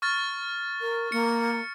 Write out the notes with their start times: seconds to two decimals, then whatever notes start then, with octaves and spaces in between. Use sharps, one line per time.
0.02 C#6 F6 A6
0.81 A#4
1.12 A#3 C#7